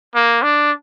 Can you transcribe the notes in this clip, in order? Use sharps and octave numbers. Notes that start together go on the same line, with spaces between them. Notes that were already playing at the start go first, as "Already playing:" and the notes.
A#3
D4